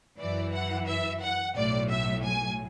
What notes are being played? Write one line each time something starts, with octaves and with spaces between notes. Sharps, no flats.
F#2 E3 D5
F#5
E5
F#5
B1 A2 F#3 D5
E5
G#5